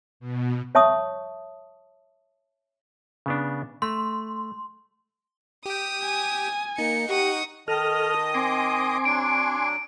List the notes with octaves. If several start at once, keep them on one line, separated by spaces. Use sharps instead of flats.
B2
C#5 E5 A5 C#6 D#6
C#3 B3 D4
A3 C6
G4 G5 D#6
G#5
A#3 D#4 C#7
G4 F#5 C#6 D#6
D#3 A4 D#5 A5 D#6 F6
C4 G#5 C6 D6
F#3 D4 D7